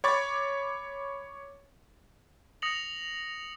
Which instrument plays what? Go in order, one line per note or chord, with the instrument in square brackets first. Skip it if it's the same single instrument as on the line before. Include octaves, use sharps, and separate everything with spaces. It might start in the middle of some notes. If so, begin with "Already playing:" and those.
[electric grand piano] C#5 B5 C#6 D6 A6
[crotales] D#6 A#6 C#7 F7 F#7